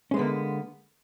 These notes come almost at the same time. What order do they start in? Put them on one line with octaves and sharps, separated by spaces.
C#4 G#3 B3 D3 A#3